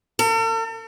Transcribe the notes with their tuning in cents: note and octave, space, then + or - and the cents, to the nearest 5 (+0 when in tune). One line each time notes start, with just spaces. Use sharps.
A4 +45